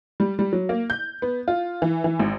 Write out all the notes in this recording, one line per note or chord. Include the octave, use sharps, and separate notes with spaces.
G3
G3
F#3
A#3
G6
B3
F4
E3
E3
G#1